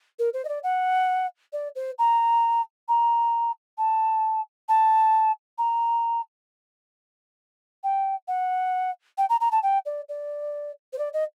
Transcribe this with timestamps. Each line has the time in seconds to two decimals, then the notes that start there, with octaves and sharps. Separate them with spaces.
0.19 A#4
0.33 C5
0.44 D#5
0.48 D5
0.63 F#5
1.52 D5
1.75 C5
1.98 A#5
2.88 A#5
3.77 A5
4.68 A5
5.58 A#5
7.83 G5
8.27 F#5
9.17 G5
9.29 A#5
9.40 A#5
9.51 A5
9.62 G5
9.85 D5
10.08 D5
10.92 C5
10.98 D5
11.13 D#5